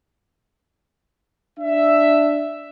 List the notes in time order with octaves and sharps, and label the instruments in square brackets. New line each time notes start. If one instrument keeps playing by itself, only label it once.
[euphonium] D4 [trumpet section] E5